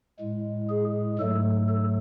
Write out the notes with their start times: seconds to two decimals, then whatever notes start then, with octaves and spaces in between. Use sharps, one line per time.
0.19 A2 G#3
0.69 G#4
1.19 G#2 F#3 A3 A4
1.69 A4